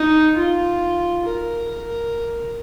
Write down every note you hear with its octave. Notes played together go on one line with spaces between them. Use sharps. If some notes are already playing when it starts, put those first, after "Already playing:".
Already playing: D#4
F4
A#4
A#4